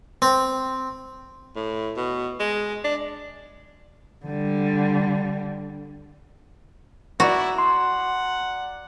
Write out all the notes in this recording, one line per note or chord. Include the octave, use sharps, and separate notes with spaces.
C4
A2
B2
G#3
D4
D3 G3
E4 F#4 D5 A#5
F#5 C6